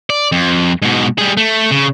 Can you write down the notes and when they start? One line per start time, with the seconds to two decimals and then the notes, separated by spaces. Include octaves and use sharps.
0.10 D5
0.32 F2
0.82 G#2 B2
1.18 G3 G#4
1.37 A3
1.71 C#3